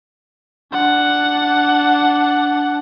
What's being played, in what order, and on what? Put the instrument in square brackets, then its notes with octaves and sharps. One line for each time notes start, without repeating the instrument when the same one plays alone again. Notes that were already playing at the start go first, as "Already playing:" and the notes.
[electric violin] D4 F#5